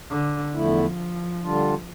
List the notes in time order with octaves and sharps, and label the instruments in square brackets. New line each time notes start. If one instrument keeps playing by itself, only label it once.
[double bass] D3
[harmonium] E2 D3 A3 E4 [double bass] F3
[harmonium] D3 G3 D4 F4